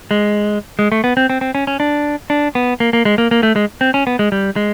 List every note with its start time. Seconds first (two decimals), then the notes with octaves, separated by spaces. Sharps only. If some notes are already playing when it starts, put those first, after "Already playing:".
0.11 G#3
0.79 G#3
0.92 A3
1.04 B3
1.17 C4
1.30 C4
1.41 C4
1.55 C#4
1.67 C#4
1.80 D4
2.30 D4
2.55 B3
2.80 A#3
2.93 A#3
3.05 G#3
3.18 A#3
3.31 A#3
3.43 A3
3.56 G#3
3.81 C4
3.94 C#4
4.07 B3
4.19 G#3
4.32 G3
4.56 G#3